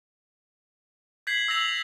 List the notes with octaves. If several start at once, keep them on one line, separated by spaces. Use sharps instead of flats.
G6 G#6 B6 C7 F#7
E6 G6 A#6 F7 F#7